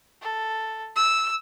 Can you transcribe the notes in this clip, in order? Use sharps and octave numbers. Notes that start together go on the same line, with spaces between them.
A4
E6